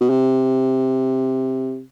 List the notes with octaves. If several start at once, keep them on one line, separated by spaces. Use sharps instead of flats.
B2
C3